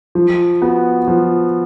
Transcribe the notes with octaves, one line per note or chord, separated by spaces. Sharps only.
F3
B3 F#4
F3